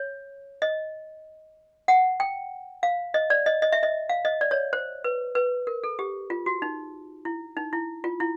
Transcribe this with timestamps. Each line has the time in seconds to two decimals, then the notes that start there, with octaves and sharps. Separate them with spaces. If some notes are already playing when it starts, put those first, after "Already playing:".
Already playing: C#5
0.62 D#5
1.88 F#5
2.20 G5
2.83 F5
3.14 D#5
3.30 D5
3.46 D#5
3.62 D#5
3.72 E5
3.83 D#5
4.09 F5
4.25 D#5
4.41 D5
4.51 C#5
4.73 C5
5.04 B4
5.35 B4
5.67 A#4
5.84 A4
5.99 G4
6.30 F4
6.46 F#4
6.62 D#4
7.25 E4
7.57 D#4
7.73 E4
8.04 F4
8.20 E4